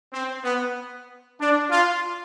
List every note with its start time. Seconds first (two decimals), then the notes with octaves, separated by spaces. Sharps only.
0.12 C4
0.44 B3
1.40 D4
1.71 F4